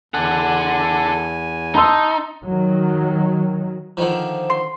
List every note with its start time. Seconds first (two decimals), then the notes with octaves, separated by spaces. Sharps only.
0.14 E2 A4 F#5 G#5
1.75 D#4 A5 C6 E6
2.46 D#3 F#3
3.97 D3 D#3 F3
4.50 C6